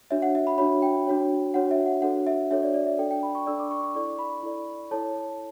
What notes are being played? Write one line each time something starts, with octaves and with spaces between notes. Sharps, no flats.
D4 F#4 C#5 E5
F#5
E5
B5
D4 F#4 C#5 B5
G5
D4 F#4 C#5
D4 F#4 C#5 F#5
E5
F#5
D4 F#4 A4 C#5 F#5
E5
D4 F#4 A4 C#5 E5
D5
D5
E5
D4 A4 D5 G5
G5
B5
C#6
D4 A4 D5 E6
D6
C#6
C#6
E4 A4 D5 C#6
B5
E4 A4 D5
E4 A4 C#5 A5